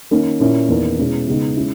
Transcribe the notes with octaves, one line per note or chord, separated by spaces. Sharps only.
D#3 A#3 C#4
A#2 A#3 C#4 E4
E2 D#3 A#3
B2 G#3 C#4 E4
C#3 G#3 B3 D#4
G#3 C#4 E4